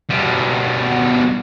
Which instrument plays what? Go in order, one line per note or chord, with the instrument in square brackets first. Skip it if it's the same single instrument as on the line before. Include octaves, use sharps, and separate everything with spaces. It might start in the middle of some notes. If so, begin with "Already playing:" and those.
[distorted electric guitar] B2 G3